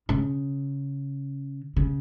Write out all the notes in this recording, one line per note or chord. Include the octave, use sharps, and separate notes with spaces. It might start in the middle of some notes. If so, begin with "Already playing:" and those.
C#3
C#3